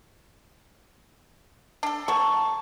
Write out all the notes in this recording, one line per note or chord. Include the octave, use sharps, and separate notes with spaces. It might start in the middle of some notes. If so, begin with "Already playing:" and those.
D4 A4
B2 F#3 A5 C#6